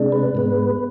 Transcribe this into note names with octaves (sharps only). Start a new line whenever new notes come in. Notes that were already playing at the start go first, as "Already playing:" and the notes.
Already playing: C3 G#3 D4
B4
G#2 G#3 B3